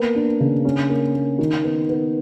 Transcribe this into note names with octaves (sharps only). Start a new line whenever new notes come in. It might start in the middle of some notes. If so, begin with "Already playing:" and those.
Already playing: A#3 B3
D4
C#3
C#4
A#3
A#3
D#3
B3
B3